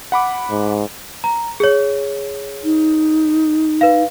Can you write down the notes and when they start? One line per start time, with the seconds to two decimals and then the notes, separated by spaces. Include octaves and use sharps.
0.12 F#5 B5 D6
0.51 G#2
1.24 A#5
1.60 G#4 C#5
2.64 D#4
3.81 B4 F5